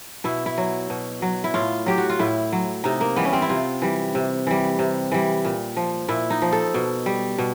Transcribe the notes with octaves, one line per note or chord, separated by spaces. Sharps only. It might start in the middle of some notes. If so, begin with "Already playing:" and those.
B2 E4
E4
F#3
B2
F#3
E4
A2 F4
F#3 G4
F#4
F4
A2 E4
F#3
C3 D#4
A#3
E3 G3 B3
C#4
C4
E4
C3 F4
E3 G3
C3
E3 G3
C3
E3 G3
A#2
F3
A#2 E4
D#4
F3
A4
B2
G3
B2